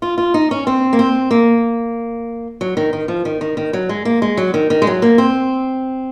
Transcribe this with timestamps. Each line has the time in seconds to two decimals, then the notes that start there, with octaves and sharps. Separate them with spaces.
0.02 F4
0.18 F4
0.34 D#4
0.51 C#4
0.67 C4
0.93 A#3
0.99 C4
1.31 A#3
2.61 F#3
2.77 D#3
2.93 D#3
3.08 F3
3.25 D#3
3.41 D#3
3.57 D#3
3.73 F#3
3.89 G#3
4.05 A#3
4.22 G#3
4.37 F#3
4.54 D#3
4.70 D#3
4.82 G#3
4.87 F#3
5.02 A#3
5.18 C4